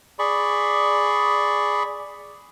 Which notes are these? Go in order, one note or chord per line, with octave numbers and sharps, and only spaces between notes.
G#4 D5 B5 C#6